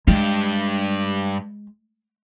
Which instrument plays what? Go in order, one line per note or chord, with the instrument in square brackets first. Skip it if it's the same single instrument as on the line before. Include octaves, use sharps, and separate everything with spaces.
[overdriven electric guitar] G2 G4 [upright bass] G#3